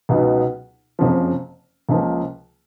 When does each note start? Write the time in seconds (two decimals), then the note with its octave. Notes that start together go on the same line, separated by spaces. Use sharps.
0.09 C#2 B2 F#3 B3 D#4
0.99 F#1 F2 C#3 F3
1.89 C#2 C#3 F3 A#3